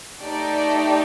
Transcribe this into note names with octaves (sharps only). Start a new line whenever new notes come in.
A3 D#4 G4 D5